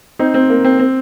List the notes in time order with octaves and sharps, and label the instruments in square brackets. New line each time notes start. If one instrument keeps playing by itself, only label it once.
[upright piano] C4 D#4
C4
A#3
C4
C4